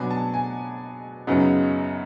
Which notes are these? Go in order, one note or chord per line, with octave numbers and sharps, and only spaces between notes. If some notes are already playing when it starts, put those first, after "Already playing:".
Already playing: B2 F#3 B3 D4 G#5
A5
G#5
F#2 C#3 F#3 B3 D#4